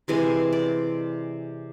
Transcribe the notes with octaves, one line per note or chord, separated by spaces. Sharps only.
C3 E3 G#3 G#5
D5